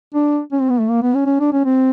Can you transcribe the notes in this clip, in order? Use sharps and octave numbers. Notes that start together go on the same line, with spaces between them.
D4
C#4
C4
B3
A3
A#3
B3
C#4
C#4
D4
C#4
C4